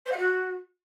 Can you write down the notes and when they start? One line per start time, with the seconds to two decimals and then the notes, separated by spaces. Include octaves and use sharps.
0.05 C5
0.11 F#5
0.17 F#4